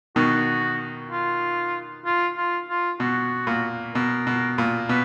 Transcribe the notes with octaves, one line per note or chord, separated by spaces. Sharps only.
B2 D#3 F#4
F4
F4
F4
F4
B2 F#4
A#2
B2 A#4
B2
A#2
B2 B4